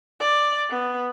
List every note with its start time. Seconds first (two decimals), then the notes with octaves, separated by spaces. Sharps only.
0.20 D5
0.70 B3